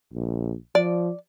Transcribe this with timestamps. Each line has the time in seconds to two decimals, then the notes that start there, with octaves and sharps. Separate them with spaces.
0.13 A#1
0.75 F3 D5